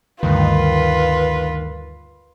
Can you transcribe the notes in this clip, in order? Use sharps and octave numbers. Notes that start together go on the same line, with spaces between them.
D2 G2 D#3 F4 B4